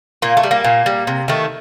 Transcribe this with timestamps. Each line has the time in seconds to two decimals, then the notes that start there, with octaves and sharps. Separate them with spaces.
0.22 A#2 A#3
0.37 A3
0.43 G3
0.51 A#3
0.64 A#2
0.86 G3
1.07 C3
1.28 D#3 A3